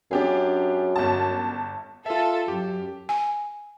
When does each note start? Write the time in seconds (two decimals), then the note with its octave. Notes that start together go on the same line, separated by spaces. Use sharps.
0.11 F#2 D4 G4 G#4
0.96 G1 A5
2.06 F4 A4 E5
2.48 F#2 G4
3.09 G#5